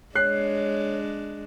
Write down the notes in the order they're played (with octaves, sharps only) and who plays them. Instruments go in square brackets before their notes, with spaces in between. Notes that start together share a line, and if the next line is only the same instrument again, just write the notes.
[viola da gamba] G#3 D4 [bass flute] C#5 [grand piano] F#6 C7